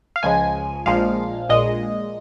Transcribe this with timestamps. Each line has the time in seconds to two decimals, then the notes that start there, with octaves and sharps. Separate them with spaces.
0.16 F5
0.23 C#2 C#3 F3 G#3 G#5
0.86 A#1 A#2 F3 G#3 F5
1.49 A#1 A#2 G#3 D#5